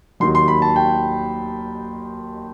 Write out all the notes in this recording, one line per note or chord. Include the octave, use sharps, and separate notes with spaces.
D#2 D#3 F#3 C6
C6
B5
A5
G5